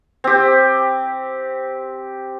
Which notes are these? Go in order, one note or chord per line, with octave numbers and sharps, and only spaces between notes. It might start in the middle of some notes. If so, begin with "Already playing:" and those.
C4 G4